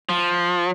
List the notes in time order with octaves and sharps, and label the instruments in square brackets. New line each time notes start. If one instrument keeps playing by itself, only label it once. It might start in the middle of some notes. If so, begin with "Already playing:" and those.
[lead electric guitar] F3